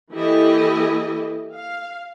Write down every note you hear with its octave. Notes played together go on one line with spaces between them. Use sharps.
E3 A#3 E4 G4 A4 D#5
F5